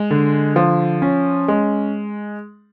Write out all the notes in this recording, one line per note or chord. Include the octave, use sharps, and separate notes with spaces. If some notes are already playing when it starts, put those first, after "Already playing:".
Already playing: G#3
D3
F3
C#4
G#3